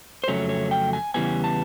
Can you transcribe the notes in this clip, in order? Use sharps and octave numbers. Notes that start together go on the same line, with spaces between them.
C5
F2 C#3 F#3 A3 C#4 C#5
C#5
G5
G#5
E2 C#3 E3 G3 B3 G#5
A5